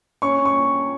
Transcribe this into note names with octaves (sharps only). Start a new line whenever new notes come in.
C#4 C#6
C#6